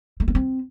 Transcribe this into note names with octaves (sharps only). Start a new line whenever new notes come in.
A3
B3
C4